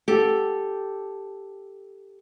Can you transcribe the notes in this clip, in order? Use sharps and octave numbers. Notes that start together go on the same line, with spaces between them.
G4 A4